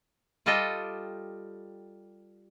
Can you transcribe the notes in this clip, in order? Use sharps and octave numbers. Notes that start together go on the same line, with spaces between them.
G3 F4 G4 A4 D#5 G5